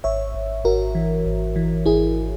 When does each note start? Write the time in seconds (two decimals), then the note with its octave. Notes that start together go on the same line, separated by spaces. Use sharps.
0.04 G#1 C#5 E5
0.35 G#1
0.64 G#1 F#4 A#4
0.95 E3
1.25 G#1
1.56 E3
1.86 G#1 E4 G#4